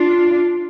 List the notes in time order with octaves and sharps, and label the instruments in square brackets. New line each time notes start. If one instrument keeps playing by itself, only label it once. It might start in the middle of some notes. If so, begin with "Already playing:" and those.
Already playing: [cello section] D4 F4